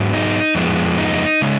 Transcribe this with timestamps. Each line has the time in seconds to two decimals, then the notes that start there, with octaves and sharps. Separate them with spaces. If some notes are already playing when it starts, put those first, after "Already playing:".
Already playing: G#2 F#3 B3
0.13 D#4
0.55 F2 F3 G#3 B3
0.98 D#4
1.42 C#3 G#3